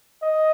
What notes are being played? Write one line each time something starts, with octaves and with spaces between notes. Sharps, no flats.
D#5